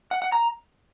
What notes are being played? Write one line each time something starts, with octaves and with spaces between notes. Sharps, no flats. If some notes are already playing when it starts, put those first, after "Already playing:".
F#5
F#5
A#5